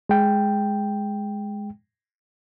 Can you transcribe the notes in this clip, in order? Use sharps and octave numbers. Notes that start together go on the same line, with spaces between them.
G#3 G5